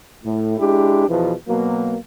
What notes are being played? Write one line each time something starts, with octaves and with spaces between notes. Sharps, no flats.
A2
G#3 D4 E4 G4
E2 B2 E3 F3
B2 F#3 A#3